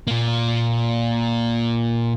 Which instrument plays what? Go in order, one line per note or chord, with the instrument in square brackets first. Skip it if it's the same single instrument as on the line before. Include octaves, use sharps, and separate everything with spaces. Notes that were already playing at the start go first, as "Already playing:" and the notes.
[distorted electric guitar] A#2 A#3